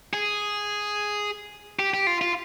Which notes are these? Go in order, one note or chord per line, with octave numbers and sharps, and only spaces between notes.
G#4
G4
G4
F4
F4